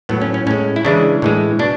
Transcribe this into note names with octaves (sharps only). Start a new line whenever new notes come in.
A2 F#3 B3
C#4
C#4
A2 G#3 C#4
E4
C#3 E3 G#3 D4
A2 E3 G#3
B2 D4